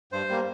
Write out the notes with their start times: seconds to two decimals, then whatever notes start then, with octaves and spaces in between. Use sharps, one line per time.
0.12 G2 C5
0.29 G3 A#3